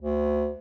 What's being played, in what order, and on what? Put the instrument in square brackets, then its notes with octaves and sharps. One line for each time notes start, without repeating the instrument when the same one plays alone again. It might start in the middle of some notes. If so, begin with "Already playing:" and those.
[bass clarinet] D2